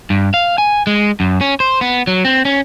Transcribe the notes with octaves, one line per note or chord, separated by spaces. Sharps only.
G2
F5
G#5
G#3
F#2
C#4
C5
B3
F#3
C4
C#4